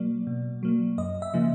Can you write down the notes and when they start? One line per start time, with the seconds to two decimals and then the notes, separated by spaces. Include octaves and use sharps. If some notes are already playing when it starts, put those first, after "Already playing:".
Already playing: B2 F#3 A#3 D5
0.27 B2
0.63 F#3 A#3
0.98 F#2 D#5
1.22 E5
1.34 C#3 F3 A#3